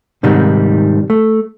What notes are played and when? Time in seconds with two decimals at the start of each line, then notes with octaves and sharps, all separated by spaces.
0.23 G#2 C3 D#3 G3 D#4
1.10 A3